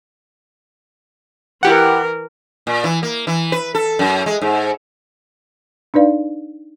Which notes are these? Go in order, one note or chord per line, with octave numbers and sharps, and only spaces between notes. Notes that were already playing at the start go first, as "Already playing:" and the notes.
E3 E4 G4 A#4 F#5
A#2
E3
A#3
E3
B4
A4
F#2
G#3
G#2
D4 D#4 B4 D5 F5